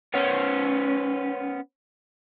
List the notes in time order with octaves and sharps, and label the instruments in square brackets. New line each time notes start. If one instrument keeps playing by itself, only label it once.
[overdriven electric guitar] B3 C#4